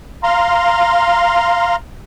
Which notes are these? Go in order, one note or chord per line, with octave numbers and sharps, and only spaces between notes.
F5 A#5 C6